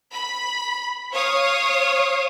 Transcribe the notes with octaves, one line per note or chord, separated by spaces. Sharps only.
B5
C#5 F5 D#6